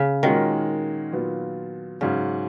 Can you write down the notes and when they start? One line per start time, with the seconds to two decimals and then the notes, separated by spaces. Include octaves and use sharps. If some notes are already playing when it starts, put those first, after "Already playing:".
Already playing: C#3
0.23 A#2 D#3 G#3 C#4 F#4 A#4
1.12 A#2 F#3 B3 F4
2.01 G#2 C#3 F#3 C#4